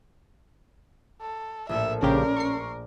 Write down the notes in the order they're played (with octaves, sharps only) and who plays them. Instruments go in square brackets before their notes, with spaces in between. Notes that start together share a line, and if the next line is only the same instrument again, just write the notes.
[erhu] A4
[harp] A#1 A2 A4 [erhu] E5
[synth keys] A#1 C#3 G4 [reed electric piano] C#4 [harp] G#4 D5 C6 [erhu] A#4
[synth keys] C#6 C7